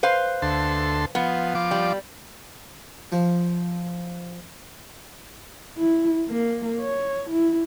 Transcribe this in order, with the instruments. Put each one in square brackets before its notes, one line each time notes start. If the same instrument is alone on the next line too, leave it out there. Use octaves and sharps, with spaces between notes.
[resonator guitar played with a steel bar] B4 C5 F5
[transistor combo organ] D2 A4 C6
[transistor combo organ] F3 [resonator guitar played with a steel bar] B3
[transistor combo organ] F3 D6
[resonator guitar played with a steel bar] G3
[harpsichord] F3
[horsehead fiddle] E4
A#3
C#5
E4